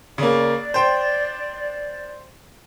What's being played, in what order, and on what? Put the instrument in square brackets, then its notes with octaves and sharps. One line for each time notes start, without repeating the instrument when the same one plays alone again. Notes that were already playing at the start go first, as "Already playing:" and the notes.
[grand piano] C#3 A#3 [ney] D5
[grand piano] C5 G5